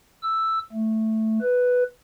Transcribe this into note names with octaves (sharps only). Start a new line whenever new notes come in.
E6
A3
B4